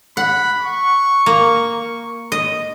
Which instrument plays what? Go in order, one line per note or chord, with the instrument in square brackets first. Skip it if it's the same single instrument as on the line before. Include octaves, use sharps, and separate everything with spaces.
[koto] F#5 [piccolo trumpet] B5
[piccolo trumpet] C#6
[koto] A#3
D#5